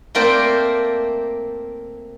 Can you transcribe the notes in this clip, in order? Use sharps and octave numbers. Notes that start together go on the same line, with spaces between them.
A3 A#3 C4 A#4 D5 G5